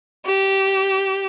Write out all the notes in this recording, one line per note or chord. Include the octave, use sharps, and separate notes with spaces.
G4